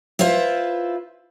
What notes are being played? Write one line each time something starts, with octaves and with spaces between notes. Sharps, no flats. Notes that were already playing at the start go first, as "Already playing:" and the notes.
E4 F4 B4 C5 E5